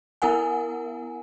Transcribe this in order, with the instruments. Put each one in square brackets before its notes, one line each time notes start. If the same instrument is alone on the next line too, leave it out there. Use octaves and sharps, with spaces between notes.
[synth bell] B3 E4 A#4 F#5 G#5